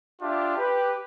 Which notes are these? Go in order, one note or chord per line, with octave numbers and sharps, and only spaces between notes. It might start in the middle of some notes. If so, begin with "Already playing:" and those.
D4 F4 G4 E5
G4 B4